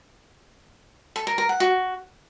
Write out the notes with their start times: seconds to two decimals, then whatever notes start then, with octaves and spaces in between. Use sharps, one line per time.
1.16 A4
1.27 A#4
1.38 A#4
1.49 F#5
1.60 F#4